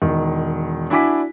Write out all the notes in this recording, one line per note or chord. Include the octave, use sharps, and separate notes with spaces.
E1 D#3
D4 E4 F#4 G#5 D6 B6